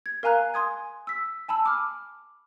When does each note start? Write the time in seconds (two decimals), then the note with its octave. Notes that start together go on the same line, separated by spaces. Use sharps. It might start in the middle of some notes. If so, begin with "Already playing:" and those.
0.06 G#6
0.23 A#4 F5 G#5 A#5 F#6
0.54 G#5 C6 D#6 G#6
1.07 E6 B6
1.48 G#5 A5 B5 E6
1.66 D6 F6